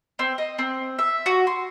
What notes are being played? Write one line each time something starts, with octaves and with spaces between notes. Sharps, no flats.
C4
D#5
C4
E5
F#4
C6